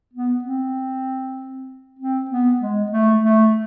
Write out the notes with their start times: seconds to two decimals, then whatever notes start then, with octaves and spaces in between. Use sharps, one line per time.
0.14 B3
0.44 C4
1.99 C4
2.31 B3
2.61 G#3
2.92 A3
3.24 A3